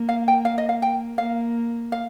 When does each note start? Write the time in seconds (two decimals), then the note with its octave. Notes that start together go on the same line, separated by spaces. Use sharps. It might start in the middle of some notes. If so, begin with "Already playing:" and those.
Already playing: A#3
0.09 F5
0.28 G5
0.45 F5
0.58 D#5
0.69 F5
0.82 G5
1.18 A#3 F5
1.92 F5